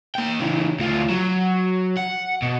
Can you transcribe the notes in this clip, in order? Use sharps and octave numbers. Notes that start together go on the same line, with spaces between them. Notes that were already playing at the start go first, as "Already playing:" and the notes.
A#3 G5
C#3 E3
D2 F4
F#3
F#5
B2